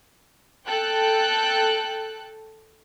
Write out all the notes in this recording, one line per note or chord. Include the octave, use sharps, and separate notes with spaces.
A4 G5 F#6